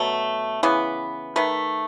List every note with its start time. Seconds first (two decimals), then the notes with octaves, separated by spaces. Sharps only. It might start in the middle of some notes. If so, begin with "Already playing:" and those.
Already playing: B2 F#3 A3
0.63 C#3 E3 B3
1.36 D#3 A3 B4